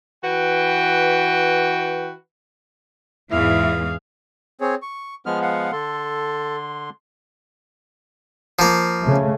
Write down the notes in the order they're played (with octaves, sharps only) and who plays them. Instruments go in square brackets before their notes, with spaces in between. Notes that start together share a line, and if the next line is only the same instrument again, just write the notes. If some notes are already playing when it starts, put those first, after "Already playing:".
[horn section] E3 F#4 B4 G5
[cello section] E2 G#2 E3 [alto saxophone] E4 [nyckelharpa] G#4 F5
[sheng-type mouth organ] C4 G#4 C#5
C#6
[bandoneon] F3 G#3 B3 [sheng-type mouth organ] F6
[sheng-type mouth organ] F5 F#5
[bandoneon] D3 C6 [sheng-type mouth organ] A4
[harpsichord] F3 A#3
[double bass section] C#3 A3